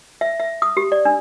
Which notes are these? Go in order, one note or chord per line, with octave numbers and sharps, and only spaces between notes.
E5
E5
D#6
G4
D5
D4